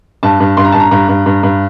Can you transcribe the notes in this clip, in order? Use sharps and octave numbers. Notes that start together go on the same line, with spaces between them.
G2 A5
G2
G2 C6
A#5
G2 A5
A#5
G2 A#5
G2
G2
G2